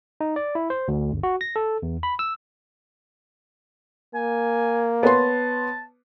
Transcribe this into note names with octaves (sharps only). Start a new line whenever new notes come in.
D#4
D5
E4
C5
D2
G1
F#4
A#6
A4
E2
B5
E6
A#3 G#5
B3 B4 C#5 A5 C6